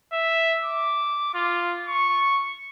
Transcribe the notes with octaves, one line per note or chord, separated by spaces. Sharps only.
E5
D6
F4
C#6